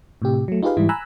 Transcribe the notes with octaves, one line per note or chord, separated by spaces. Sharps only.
A2 C3 G4
F#3 A3
D#4 F4 G4 G#4 B4 F5
G#2 E3 G3 E4
G#5 A#5 B5 E6 F#6